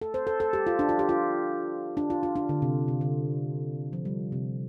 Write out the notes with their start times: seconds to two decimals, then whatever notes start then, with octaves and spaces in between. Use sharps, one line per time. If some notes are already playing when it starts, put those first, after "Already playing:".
0.02 A4
0.14 C5
0.27 A4
0.40 A4
0.53 G4
0.67 F4
0.79 D4
0.89 F4
0.99 G4
1.09 F4
1.97 D4
2.10 F4
2.23 F4
2.36 D4
2.49 D3
2.62 C3
2.88 C3
3.01 D3
3.93 F3
4.05 G3
4.32 C3